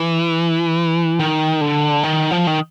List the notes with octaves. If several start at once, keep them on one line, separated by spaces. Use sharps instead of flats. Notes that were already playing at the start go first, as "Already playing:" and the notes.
Already playing: E3
D#3
D3
D#3
F3
D#3